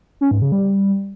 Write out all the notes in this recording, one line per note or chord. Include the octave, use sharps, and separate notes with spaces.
C#4
G#2
C#3
G3